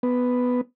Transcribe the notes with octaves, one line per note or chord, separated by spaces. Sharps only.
B3